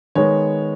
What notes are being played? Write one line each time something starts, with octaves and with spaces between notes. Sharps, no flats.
D#3 G#3 B3 C#5